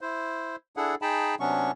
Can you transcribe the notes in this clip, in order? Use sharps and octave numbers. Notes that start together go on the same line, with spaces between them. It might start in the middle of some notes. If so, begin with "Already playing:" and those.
E4 C5
D4 E4 G#4 A4 F#5
D#4 G#4 G5 A5 B5
C3 F#3 B3 C#4 D4 C#6